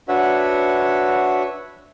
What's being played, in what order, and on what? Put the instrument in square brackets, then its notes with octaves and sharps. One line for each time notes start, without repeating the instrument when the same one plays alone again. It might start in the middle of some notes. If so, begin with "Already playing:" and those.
[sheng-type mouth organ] D4 F#4 B4 C#5 E5 F#5